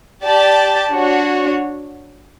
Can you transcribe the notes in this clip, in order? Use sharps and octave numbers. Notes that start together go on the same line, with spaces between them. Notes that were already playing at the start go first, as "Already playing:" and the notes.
G4 D5 A5
D4 F#4 C#5